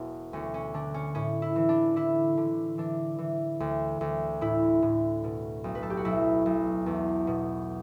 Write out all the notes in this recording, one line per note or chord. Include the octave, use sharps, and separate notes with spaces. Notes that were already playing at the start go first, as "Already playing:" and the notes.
Already playing: E1 B2
D2 C#4
C#4
D3 D4
C#4
A2 C#4
E4
E3
D4
D3 E4
D3
E3 D4
E3
D2
D2
A2 E4
A2
B2
B1
B4
A4
G4
F#4
B1 E4
B1
E2
B2